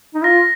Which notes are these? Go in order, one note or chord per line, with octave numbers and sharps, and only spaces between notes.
D#4
F4 A#6